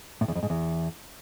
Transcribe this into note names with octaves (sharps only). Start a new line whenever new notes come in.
A2
E2
F2
G#2
E2